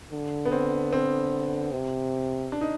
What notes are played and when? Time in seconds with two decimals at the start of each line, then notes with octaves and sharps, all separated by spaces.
0.12 D3
0.45 B3
0.52 C4
0.93 C4
1.72 C3
2.52 D4
2.61 D#4